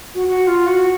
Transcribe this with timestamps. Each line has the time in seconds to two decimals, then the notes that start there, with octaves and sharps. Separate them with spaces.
0.15 F#4
0.28 F#4
0.47 F4
0.67 F#4